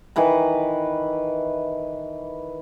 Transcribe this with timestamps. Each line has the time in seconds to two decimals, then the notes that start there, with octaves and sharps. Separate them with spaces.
0.16 D#3 E3 B4 A#5